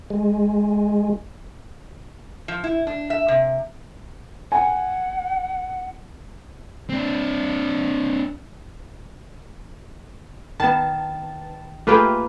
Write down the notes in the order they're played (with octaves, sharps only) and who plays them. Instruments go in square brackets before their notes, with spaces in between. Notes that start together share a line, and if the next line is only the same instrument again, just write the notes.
[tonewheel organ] G#3
[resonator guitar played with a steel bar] F3
E4
D4
E5
C3
[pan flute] F#5 [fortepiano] G#5
[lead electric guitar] C4 D4
[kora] D#3 [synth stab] B3 A5
[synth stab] A3 G4 G#4 [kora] A#3 F4 B4